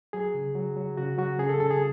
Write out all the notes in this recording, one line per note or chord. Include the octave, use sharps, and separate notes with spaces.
F#3 G#4
C#3
F#3
F#3
C#3 F#4
F#3 F#4
C#3 G#4
A4
C#3 A4
G#4